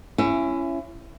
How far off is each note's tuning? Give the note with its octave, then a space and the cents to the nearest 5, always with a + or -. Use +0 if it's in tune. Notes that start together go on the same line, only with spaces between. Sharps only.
C#4 +0 E4 +30 E5 +25